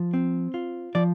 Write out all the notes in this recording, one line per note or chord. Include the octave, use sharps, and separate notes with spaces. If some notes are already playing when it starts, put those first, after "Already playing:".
Already playing: F3
C4
F4
F3 D5